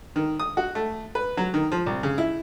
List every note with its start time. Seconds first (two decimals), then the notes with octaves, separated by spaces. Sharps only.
0.16 D#3
0.40 D#6
0.57 F#4
0.75 A3
1.15 B4
1.37 F#3
1.54 D#3
1.72 F3
1.86 C2
2.03 C#3
2.18 E4